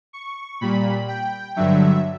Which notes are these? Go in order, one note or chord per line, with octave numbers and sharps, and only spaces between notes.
C#6
A#2 G3 B5
G5
G2 D3 F#3 E5